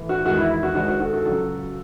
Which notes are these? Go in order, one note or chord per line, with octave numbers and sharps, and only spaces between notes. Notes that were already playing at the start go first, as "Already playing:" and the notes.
Already playing: A2 E3
F#4
E2 D#3 G#3 F#4
E4
E4
F#4
G#2 D#3 G#3 F#4
F#4
F#4 A4
F#4 A4
C#2 C#3 F#3 F#4 A4